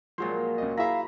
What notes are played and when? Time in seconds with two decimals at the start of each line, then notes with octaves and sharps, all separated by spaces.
0.18 A#2 F3 F#3 G#3 C5
0.58 C#2 D#5
0.77 E4 G#4 E5 F5 A#5 B5